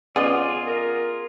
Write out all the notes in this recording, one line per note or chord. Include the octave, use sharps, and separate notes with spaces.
C#3 B3 F4 G#4 D5 D#5
A#4